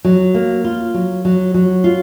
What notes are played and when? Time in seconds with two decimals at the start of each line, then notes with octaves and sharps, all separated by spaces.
0.04 F#3
0.34 A#3
0.64 F4
0.94 F#3
1.25 F#3
1.54 F#3
1.84 F4